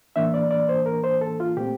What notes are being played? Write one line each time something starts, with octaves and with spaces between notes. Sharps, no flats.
A2 E3 A#3 D4 E5
D5
D5
C5
A#4
C5
A4
F4
A#2 A3 C4 G4